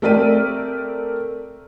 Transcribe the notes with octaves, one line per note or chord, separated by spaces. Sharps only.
A3 C4 A#4 D5 B6 D#7